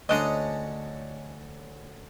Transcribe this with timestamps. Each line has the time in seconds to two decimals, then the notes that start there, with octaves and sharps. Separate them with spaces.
0.09 D2 G#3 C#4 D4 D#5 A#5